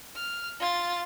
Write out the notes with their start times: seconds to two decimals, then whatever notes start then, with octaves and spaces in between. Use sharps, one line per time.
0.16 F6
0.60 F4 A6